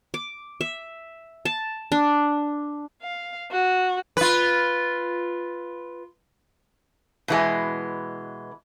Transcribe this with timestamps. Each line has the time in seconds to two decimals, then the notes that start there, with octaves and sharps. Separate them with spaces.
0.14 D6
0.61 E5
1.45 A5
1.92 D4
3.02 F5
3.51 F#4
4.17 F4 B4
7.28 B2 E3 G#3